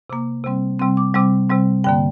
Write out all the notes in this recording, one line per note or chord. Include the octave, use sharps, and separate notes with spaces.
C3 A#3 D6
C3 G3 C4
C3 G3 C4 C6
D6
C3 G3 C4 D6
C3 G3 C4
G2 D3 A#3 G5